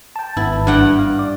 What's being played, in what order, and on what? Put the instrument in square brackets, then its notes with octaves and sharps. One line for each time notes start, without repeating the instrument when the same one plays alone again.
[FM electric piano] G5 A5
[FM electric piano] G#1 B3 A5 [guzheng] E4
[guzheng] G2 F#5 G5
[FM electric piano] F5
D5